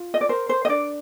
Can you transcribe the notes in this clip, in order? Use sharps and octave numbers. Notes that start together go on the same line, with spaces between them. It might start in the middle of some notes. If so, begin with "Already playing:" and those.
Already playing: F4
D#5
D5
A#4 C5
C5
D#5
D4 D5